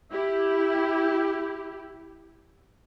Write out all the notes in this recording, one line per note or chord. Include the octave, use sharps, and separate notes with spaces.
E4 G4